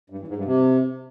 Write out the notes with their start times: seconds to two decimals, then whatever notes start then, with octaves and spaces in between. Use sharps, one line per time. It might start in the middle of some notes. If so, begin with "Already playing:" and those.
0.10 G2
0.19 E2
0.28 G#2
0.36 G2
0.45 C3